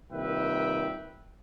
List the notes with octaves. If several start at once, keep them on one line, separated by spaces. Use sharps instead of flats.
C2 A#2 D#3 B4 E5 G5